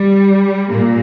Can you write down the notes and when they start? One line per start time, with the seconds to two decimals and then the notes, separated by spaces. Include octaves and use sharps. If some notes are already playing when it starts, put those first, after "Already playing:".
Already playing: G3
0.70 A#2 A#3